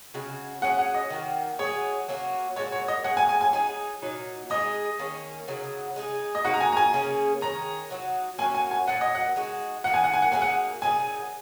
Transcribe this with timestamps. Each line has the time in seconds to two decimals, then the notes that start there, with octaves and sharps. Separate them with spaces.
0.14 C#3 G#3 F#4
0.61 F#3 C#4 G#4 F#5
0.79 F#5
0.94 D#5
1.10 D#3 A#3 F#4
1.59 F#3 D#4 G#4 C#5
2.08 F#3 A#3 C#4 F#4
2.56 A#2 G#3 F#4 C#5
2.72 C#5
2.88 D#5
3.04 F#3 C#4 G#4 F#5
3.17 G#5
3.29 G#5
3.41 G#5
3.53 F#3 D#4 G#4 G#5
4.02 A#2 F#3 D#4
4.50 G#3 D#4 G#4 D#5
4.99 D#3 A#3 C#4
5.48 C#3 F#3 D#4
5.96 G#3 D#4 G#4
6.35 D#5
6.44 C#3 A#3 D#4 F#4 F#5
6.54 A#5
6.61 G#5
6.72 A#5
6.77 G#5
6.93 C#3 A#3 C#4 G#4
7.41 D#3 G#3 C#4 A#5
7.90 F#3 D#4 F#4
8.38 F#3 A#3 C#4 F#4 G#5
8.55 G#5
8.71 G#5
8.87 A#2 F#3 D#4 F#5
9.01 D#5
9.15 F#5
9.36 G#3 D#4 F#4
9.84 D#3 A#3 D#4 F#5
9.94 G#5
10.04 F#5
10.14 G#5
10.22 F#5
10.32 F#3 A#3 D#4 G#4 G#5
10.42 F#5
10.81 A#2 F#3 D#4 G#4 G#5